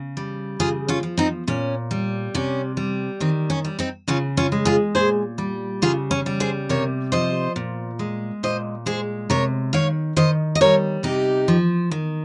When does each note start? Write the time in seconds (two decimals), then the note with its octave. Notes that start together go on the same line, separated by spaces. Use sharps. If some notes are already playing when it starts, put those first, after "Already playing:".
Already playing: C#3
0.17 G3
0.59 C#3 F4 G#4
0.88 C#4 F4
1.03 F3
1.18 C4 D#4
1.47 A#2 C#4
1.91 G3
2.35 C3 C#4
2.77 G3
3.20 D#3 C4
3.50 C#4
3.65 G3
3.79 C4 D#4
4.08 C#3 C#4 F4
4.37 C#4 F4
4.52 G#3
4.65 F4 G#4
4.95 A#2 G#4 C5
5.38 G3
5.82 C#3 F4 G#4
6.11 C#4
6.26 G3
6.40 G#4 C5
6.69 C3 A#4 C#5
7.12 F3 C5 D#5
7.56 A#2
7.99 G#3
8.43 A#2 C5 D#5
8.86 G#3 G#4 C5
9.30 C3 A#4 C#5
9.73 D#3 C#5 F5
10.16 D#3 C5 D#5
10.55 D#5
10.61 G3 A#4 C#5
11.03 C3 D#4 G4
11.48 F3
11.91 D#3